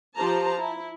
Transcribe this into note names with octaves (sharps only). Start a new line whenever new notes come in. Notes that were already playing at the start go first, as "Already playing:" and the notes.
F3 G4 C5 A5 A#5
E4